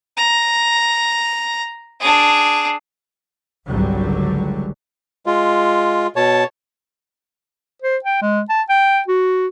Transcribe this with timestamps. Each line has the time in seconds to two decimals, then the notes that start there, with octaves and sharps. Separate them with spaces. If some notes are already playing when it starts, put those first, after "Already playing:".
0.17 A#5
2.00 D4 G#4
3.67 G#1 C#2 D3 F#3 G3
5.26 G#3 F4
6.16 B2 C#5 A5
7.82 C5
8.04 G5
8.22 G#3
8.49 A5
8.69 G5
9.08 F#4